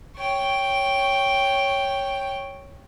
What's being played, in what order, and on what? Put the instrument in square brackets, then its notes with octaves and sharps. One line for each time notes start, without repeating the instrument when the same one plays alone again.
[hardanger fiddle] C#5 G5